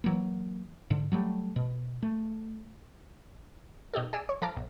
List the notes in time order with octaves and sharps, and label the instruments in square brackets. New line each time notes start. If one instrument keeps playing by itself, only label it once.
[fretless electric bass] E3 F#3 A#3
G#2 D3
F#3 G3 A3
B2
A3
[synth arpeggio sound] B2 D#4 G4 A4
G#4 D5 D#6 E6
C#5
F3 A4 A#5 D6 F6
B1